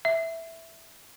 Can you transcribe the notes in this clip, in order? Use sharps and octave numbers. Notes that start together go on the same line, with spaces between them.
E5